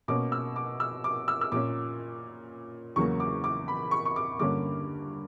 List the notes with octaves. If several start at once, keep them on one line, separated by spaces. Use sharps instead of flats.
B2 A#3 C#4 D6
E6
D6
E6
D6
E6
E6
A#2 A#3 C#4 D6
E2 C#3 F#3 A#3 C#6
D6
D6
B5
C#6
C#6
D6
G2 D3 A#3 C#4 D6